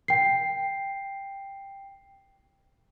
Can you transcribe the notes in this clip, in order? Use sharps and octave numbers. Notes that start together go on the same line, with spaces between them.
G5 C7